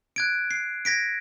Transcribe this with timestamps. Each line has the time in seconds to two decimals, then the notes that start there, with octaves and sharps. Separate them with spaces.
0.16 F#6 G#6 D7
0.51 C7
0.85 G#6 A#6 B6 D7